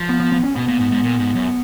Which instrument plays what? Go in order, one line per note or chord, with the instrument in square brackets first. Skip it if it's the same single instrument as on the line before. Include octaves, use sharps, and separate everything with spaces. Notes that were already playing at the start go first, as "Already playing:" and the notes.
Already playing: [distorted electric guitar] F3
[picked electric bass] B3
B3
B3
C#4
[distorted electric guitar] B2 [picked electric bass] B3
[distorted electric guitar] A#2
G#2
G#2
A#2
G#2
F#2